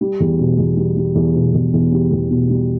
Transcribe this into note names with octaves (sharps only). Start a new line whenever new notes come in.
G3
E2
B2
E2
G3
G3
E2
B2
E2
E2
G3
E2
B2
G3